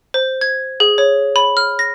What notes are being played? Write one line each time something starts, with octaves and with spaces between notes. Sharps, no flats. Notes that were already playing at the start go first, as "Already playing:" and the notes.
C5
G#6
G#4
C#5
B5
F6
A#6